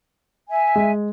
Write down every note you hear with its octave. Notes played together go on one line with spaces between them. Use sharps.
E5 G#5
G#3